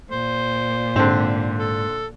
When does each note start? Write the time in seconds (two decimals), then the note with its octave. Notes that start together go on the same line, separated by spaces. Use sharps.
0.11 A#2 C5
0.96 G#2 D3 C4
1.59 A4